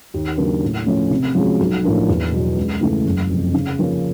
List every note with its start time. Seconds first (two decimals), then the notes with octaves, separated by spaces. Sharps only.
0.14 D#2
0.37 C#3 F#3 A#3 D4
0.63 A2
0.86 F3 A3 C#4
1.11 C3
1.35 F3 G#3 C#4 F#4
1.60 B1
1.83 A2 F3 A#3 D4
2.09 E2
2.32 B2 F#3
2.57 C#2
2.81 C#3 E3 A3
3.05 F#1
3.30 F2 C3
3.54 C#3
3.79 F3 A#3 C#4